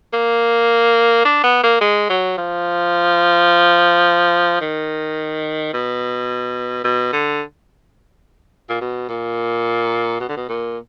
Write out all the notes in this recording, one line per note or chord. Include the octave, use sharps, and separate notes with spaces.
A#3
D4
B3
A#3
G#3
F#3
F3
D#3
B2
B2
D3
A#2
B2
A#2
B2
D3
B2
A#2